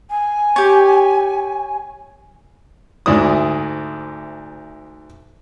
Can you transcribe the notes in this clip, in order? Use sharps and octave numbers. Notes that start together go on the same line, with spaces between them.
G#5
G4 C#5
D2 G#2 D4 E4 D#6